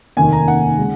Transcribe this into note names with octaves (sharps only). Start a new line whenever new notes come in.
F1 D#2 D#3 A#3 G#5
A#5
F#5
C#3 G#3